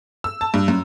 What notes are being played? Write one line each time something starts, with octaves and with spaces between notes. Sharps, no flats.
E6
A5
G2
F#2